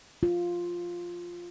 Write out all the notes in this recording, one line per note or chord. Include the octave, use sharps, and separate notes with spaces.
F4